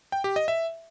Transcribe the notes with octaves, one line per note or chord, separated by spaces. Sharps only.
G5
G4
D#5
E5